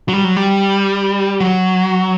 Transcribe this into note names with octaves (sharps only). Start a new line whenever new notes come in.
F#3
G3
F#3
G3
F#3